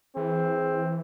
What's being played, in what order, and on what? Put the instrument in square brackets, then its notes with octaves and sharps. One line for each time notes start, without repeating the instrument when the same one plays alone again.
[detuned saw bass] E3 [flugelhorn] C4 [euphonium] G#4